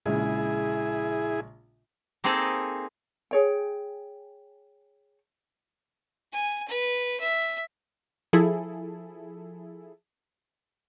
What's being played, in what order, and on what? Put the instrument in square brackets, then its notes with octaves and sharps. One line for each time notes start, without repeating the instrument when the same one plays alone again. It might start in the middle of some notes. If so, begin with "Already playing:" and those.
[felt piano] A#1 C#3 G#3 [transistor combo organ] E4 G#4
[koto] A#3 C4 D#4 G#4 A4
[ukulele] G#4 C#5 G5
[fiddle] G#5
B4
E5
[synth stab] F3 E4 G#4 A4